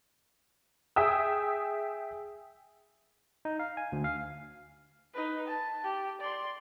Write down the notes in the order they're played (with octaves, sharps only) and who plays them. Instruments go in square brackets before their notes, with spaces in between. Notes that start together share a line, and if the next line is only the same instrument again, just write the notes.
[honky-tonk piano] G#4 E5 G5 D#6 E6
[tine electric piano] D#4
F5
G#5
D2
F5
[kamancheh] D#4 B4
A5
G4
D5 C6